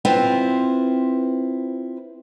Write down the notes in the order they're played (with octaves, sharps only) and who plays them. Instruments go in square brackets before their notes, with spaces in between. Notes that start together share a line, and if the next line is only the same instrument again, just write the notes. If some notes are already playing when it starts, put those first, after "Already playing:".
[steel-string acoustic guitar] C4 E4 F4 B4 C5